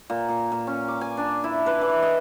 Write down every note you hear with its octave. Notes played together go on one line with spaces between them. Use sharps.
A#2
A#2
A#2
C#4
D6
G#5
D4
E4
B4
E3
D#5